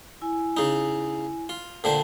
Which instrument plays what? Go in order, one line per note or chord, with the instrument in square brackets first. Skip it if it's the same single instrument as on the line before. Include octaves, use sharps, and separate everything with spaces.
[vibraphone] E4 G#5
[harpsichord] C#3 D#4
F4
[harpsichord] A#2 D3 C5 [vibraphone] G5 A5